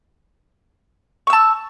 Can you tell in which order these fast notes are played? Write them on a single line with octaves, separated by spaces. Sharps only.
C#6 E6 A5